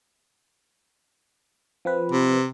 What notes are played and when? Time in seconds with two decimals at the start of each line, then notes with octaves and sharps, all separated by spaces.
1.85 F3 C4 B4
2.12 C3